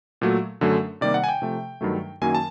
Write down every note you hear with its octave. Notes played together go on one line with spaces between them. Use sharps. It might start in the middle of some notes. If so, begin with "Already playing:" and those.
A#2 F#3 A3
F#2 D3 F#3 A3
C3 D#3 G3 A#3 D5
F#5
G#5
G5
C3 F3 A3
G2 D#3 F#3 A3
F#2 D#3 F#3 A#3 G#5
A5